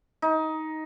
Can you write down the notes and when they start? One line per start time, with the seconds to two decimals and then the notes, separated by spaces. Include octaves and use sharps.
0.22 D#4